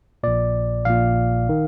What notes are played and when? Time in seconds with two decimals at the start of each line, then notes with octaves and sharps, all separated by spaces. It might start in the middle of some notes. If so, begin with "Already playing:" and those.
0.23 A#1 A#2 D5
0.85 A#1 A#2 F5
1.49 D#3